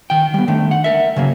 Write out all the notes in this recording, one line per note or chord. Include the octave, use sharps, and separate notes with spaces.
D#3 G5
G3 B3
D3 D#3 A3
F#5
A#4 E5
C#3 F#3 A#3